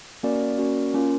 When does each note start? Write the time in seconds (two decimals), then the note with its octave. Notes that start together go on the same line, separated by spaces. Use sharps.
0.23 A#3 C#4 F#4 A#4 D5
0.58 A#3 C#4 F#4 A#4 D5
0.94 A#3 C#4 F4 A#4